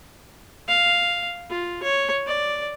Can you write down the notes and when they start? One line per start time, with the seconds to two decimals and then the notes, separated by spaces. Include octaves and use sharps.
0.68 F5
1.50 F4
1.83 C#5
2.27 D5